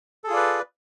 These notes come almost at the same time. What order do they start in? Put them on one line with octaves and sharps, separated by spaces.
A4 G#4 F4 D5 B4